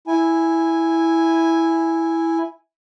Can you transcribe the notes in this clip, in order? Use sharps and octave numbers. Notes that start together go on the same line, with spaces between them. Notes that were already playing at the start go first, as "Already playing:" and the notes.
E4 G#5